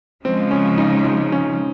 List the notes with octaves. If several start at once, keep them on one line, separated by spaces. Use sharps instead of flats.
C#3 F3 G#3 C4
C#4
D#4
D#4
C#4